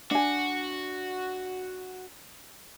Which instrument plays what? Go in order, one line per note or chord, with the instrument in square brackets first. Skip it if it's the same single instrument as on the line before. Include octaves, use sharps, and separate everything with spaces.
[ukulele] D4 G#5 [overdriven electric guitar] F#4